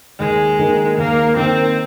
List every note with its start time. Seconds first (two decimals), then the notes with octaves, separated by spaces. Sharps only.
0.19 D#2 G#3
0.59 D#3 A#3
0.98 D#2 A#3
1.36 D#3 A#3 C4